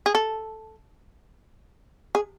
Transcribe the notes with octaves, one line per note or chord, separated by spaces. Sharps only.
G#4
A4
G#4